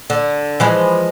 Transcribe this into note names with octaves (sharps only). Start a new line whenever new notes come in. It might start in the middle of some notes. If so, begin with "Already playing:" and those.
D3
E3 F3 G#3